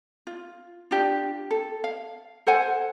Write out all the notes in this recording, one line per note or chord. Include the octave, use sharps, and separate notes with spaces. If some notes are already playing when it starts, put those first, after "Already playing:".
F4
D4 F4 G4
A4
F5
A4 C5 F#5 G#5